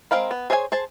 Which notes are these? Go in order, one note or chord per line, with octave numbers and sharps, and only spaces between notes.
G#3 C4 A#4 F5 B5
B3
G#4 C5 C#5 E5 G#5
G#4 C5 A5